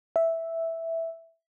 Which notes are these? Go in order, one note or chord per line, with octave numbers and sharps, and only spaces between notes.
E5